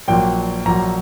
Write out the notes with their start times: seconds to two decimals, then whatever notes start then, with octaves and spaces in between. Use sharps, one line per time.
0.08 A#1 A#2 F#3 G5
0.65 A#1 A#2 F#3 A#5